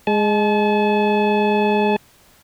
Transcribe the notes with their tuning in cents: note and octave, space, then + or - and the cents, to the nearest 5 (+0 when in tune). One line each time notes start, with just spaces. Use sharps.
G#3 +0 A5 -40